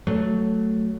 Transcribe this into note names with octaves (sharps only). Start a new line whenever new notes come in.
F#3 A3